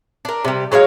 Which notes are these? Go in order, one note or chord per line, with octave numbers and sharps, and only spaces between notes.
D4 A#4
C3 G3
F#3 G#3 C#5 F5